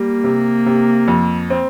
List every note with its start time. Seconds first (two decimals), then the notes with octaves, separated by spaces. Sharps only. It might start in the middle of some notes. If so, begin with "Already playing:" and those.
Already playing: G3 A#3
0.24 C3
0.66 C3
1.08 F2
1.50 C4